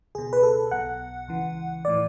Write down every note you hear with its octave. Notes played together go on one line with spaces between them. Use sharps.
C#2 B2 G#4
B4
A4
B1 B2 F#5
C#2 C#3 E3
A2 E3 D5